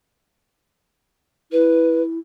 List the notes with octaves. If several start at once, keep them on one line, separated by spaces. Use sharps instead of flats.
E4 B4